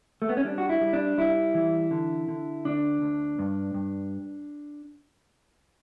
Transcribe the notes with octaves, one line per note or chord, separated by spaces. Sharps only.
A3
B3
C#4
G3 D4
F#4
E4
G3
D4
G3 E4
E3
D3
D3
D2 D4
D2
G2
G2